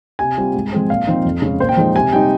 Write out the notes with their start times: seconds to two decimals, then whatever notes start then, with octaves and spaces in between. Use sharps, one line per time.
0.19 C3 G#5
0.37 G3 C4 F4
0.54 G#2
0.72 F3 G#3 C4
0.90 A#2 F5
1.07 F3 C4 D#4
1.25 F2
1.42 C#3 G#3 C#4
1.60 A#2 C5
1.69 G5
1.77 F3 G#3 D#4
1.95 C3 G#5
2.12 G3 C4 D#4 G5